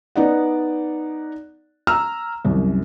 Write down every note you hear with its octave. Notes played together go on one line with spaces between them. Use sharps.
B3 D#4 D5 F#5
A#5 E6 F6
C2 F#2